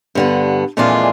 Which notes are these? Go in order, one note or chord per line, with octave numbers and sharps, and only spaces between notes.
G2 D3 B3
F2 A#2 E3 G#3 D4 F4